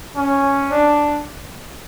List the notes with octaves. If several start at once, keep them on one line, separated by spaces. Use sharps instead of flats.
C#4
D4